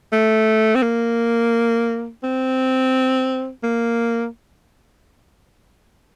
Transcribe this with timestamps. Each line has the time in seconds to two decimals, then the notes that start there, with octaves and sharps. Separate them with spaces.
0.13 A3
0.75 C4
0.82 A#3
2.23 C4
3.63 A#3